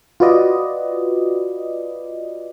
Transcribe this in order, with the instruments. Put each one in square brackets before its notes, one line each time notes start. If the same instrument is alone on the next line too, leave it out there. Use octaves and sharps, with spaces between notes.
[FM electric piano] F4 F#4 B4 D5 D#5